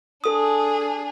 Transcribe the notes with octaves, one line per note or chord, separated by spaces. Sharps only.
D4 G#4 A4 D#6